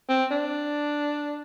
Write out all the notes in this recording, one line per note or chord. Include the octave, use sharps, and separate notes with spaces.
C4
D4